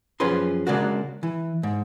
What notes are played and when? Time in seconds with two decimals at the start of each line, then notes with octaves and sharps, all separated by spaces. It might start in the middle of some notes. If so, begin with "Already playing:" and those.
0.20 F#2 F3 C#4 G#4 B4 C6
0.67 C#3 G#3 A#3 D4 F#4
1.23 E3
1.63 G#2